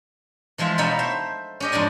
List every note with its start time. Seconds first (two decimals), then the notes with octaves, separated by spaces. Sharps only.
0.58 E3 F3 G#3 F4 E5
0.78 B2 D#4 A4 C#5 E5 B5
0.99 C5 E5
1.60 C#4 G4 D#5
1.72 F2 G#2 D4 D5 G#5